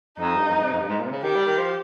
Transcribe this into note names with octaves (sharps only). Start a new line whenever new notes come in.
F2 D#4
G2
F2
G2
C3
F2
G2
G#2
A#2
C3
C#3
D#3 G4
G3
D#3
F3